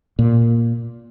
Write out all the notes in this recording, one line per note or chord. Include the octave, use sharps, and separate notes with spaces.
A#2